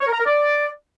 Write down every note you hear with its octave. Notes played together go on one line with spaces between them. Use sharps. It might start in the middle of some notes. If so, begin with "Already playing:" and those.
C#5
A#4
A#5
A#4
D5